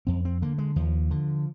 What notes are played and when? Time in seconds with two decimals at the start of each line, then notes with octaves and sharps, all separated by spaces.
0.07 F2 C4
0.25 C4
0.42 D3 A#3
0.58 G#3
0.76 D#2 F3
1.11 D3